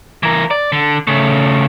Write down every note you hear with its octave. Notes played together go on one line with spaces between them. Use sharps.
E3 A#4
D5
D3
C#3 A3